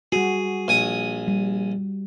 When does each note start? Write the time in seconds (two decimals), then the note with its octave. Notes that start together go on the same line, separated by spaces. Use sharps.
0.12 G3 F#4 G#4
0.68 A#1 G#5 D#6
1.28 G3